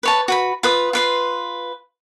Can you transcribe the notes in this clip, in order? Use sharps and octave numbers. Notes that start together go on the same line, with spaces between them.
B4 C#5 A5
F#4 B4 B5
F4 B4 D#6
F4 B4 C6